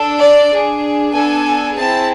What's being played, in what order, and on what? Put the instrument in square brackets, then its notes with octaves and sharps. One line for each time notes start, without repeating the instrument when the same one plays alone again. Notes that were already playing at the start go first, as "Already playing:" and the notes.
Already playing: [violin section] D4 A4
D5
D4 G#4
B3 D4 A4 G#5
C4 E4 G#4 A5